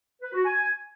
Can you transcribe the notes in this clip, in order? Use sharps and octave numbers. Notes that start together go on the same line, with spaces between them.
B4
F#4
G#5